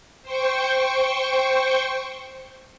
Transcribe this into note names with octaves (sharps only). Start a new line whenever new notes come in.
C5 G5 C#6